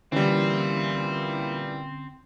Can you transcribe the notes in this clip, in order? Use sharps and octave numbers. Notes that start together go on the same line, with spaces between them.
A#2 D3 E3 G3 C4 C#4 E4